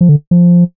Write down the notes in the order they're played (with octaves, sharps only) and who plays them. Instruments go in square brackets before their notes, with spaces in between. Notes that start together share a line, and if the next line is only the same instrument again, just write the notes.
[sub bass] F3
D3
F3